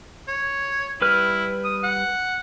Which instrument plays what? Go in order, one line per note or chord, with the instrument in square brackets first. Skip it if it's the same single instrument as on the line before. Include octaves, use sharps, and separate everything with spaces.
[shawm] C#5
[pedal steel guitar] G3 B4 F6 [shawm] E4
[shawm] D#6
F#5